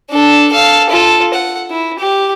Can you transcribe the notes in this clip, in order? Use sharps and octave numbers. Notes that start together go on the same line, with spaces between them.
D4 A4
A4 F5
F4 A4
F#5
E4
G4